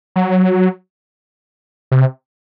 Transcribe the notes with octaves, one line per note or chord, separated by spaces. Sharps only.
F#3
C3